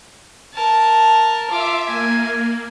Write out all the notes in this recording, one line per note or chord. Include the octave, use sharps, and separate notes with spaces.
A#4 A5
F4 E5 D6
A#3 G#5